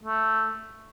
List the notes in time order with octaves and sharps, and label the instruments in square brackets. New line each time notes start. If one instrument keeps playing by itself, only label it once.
[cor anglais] A3